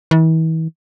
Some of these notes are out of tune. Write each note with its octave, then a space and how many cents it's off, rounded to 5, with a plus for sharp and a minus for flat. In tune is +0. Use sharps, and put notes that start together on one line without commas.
E3 -40